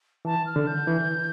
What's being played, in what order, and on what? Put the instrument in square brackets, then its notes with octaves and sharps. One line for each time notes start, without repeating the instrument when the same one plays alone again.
[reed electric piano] E3 [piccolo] A5
[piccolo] F6
[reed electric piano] D3
[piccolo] G6
[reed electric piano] E3